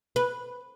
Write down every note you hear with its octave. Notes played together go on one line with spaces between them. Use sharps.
B4